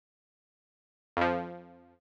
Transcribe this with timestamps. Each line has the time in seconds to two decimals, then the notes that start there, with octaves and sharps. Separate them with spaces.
1.17 F2 F3